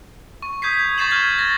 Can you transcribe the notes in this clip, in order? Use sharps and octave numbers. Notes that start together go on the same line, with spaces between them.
C#6
D#6 G6 G#6 B6 C7
G#6
C#6 G6 A6 C7 E7 F#7
F6 G6 G#6 C7
A6 A#6